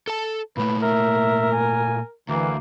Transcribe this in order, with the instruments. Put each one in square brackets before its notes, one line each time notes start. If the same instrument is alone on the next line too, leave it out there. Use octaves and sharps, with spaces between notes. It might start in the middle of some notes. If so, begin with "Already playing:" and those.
[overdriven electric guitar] A4 A5
[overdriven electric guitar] A#2 A3 [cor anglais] B4
[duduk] A#4 [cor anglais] E5
[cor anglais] G#5
[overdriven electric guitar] D2 [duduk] E3 [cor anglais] A#3